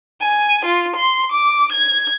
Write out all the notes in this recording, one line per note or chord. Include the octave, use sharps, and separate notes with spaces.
G#5
F4
C6
D6
G#6